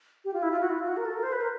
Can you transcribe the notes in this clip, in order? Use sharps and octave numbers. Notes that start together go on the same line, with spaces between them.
G4
F4
E4
F4
F#4
E4
F4
F#4
A#4
A4
A#4
C5
B4
A#4